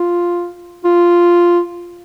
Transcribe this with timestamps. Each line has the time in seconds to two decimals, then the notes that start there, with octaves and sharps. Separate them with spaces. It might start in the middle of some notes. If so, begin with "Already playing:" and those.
Already playing: F4
0.84 F4